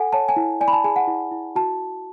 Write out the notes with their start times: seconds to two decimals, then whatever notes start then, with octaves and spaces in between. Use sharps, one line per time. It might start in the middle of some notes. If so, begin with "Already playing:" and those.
Already playing: A4 F#5 G#5
0.13 C#5 A5
0.29 G#5
0.36 E4
0.61 D5 G#5
0.68 B5
0.73 A5
0.84 G#4 G#5
0.96 F#5
1.08 E4
1.31 E4
1.56 F#4 A5